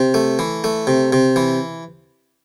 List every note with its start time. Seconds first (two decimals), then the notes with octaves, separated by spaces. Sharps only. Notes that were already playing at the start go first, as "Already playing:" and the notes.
Already playing: C3
0.14 A3
0.39 E3
0.64 A3
0.87 C3
1.12 C3
1.36 E3